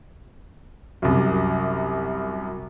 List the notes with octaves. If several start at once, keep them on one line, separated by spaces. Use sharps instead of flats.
C2 F#2